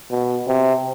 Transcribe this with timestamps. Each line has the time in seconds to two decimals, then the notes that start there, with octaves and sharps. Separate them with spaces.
0.11 B2
0.47 C3